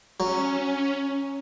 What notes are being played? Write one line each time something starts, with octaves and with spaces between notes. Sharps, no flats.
F#3 C#4